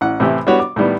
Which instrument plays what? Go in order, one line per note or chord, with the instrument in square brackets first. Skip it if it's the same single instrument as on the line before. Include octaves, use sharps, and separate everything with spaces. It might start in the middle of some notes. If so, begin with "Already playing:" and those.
[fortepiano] A1 F#5
A2 C3 E3 G4
G3 B3 D4 F#4 C#5
D6
A2 D#3 G3 B3